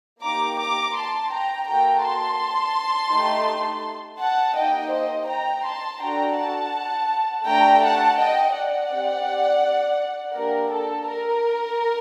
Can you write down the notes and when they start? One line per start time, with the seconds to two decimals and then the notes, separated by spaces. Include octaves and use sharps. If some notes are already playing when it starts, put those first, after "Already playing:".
0.22 A#3 D#4 G4 A#5 D6
0.58 A#5 D6
0.95 A5 C6
1.31 G5 A#5
1.67 A#3 F#4 A4 G5 A#5
2.03 A5 C6
3.12 A3 D#4 G4
4.20 F#5 A5
4.56 A#3 D#4 G4 D#5 G5
4.92 C5 D#5
5.28 G5 A#5
5.65 A5 C6
6.01 D4 F#4 A4 G5 A#5
6.38 F#5 A5
7.46 A3 D4 G4 G5 A#5
7.82 F#5 A5
8.18 D#5 G5
8.54 D5 F#5
8.91 C4 G4
10.35 A#3 D4 G4 A#4
10.71 A4
11.07 A#4